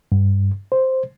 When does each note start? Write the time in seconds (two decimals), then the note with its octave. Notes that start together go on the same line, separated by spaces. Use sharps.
0.12 G2
0.72 C5